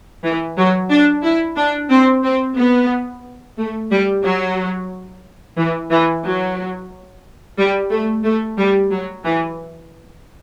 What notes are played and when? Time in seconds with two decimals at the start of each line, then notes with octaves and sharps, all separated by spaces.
0.24 E3
0.57 F#3
0.90 D4
1.23 E4
1.56 D4
1.90 C4
2.23 C4
2.57 B3
3.58 A3
3.90 G3
4.24 F#3
5.57 E3
5.90 E3
6.24 F#3
7.58 G3
7.91 A3
8.24 A3
8.57 G3
8.90 F#3
9.24 E3